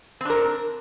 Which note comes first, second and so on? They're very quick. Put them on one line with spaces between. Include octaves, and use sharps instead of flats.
C4 D4 A#4